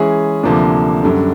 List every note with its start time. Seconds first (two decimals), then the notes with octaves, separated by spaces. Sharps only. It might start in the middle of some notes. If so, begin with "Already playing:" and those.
Already playing: E3 G#3 C#4 E4 G#4
0.43 D2 C3 F3 A#3 D4
1.03 F#2 D3 G3